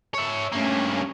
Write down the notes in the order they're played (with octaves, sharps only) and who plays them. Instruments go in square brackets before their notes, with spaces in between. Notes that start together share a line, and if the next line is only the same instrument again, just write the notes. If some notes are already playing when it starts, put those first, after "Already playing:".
[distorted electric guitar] C#5 E5
[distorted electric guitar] G2 A#3 [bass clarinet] A3 [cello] C#4